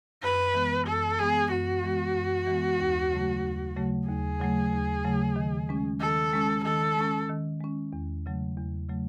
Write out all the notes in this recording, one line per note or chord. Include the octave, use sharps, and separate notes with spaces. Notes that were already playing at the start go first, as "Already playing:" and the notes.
F#2 B4
E3 G#3 B3
F#2 A4
E3 G#3 B3 G#4
F#2 F#4
E3 G#3 B3
F#2
E3 G#3 B3
D#2
C#3 F#3 A3
D#2
C#3 F#3 A3
D#2 G#4
C#3 F#3 A3
D#2
C#3 F#3 A3
D#3
G#3 C#4
D#3 A4
G#3 C#4
D#3 A4
G#3 C#4
D#3
G#3 C#4
E2
C#3 F#3 A3
E2
C#3 F#3 A3